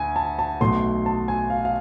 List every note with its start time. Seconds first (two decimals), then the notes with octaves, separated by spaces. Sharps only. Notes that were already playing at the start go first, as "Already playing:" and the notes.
Already playing: D2 G#5
0.16 A5
0.39 A5
0.61 B1 B2 A3 C6
1.06 A5
1.28 G#5
1.50 F5
1.65 F5